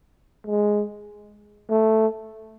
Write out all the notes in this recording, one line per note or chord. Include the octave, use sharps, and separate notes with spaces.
G#3
A3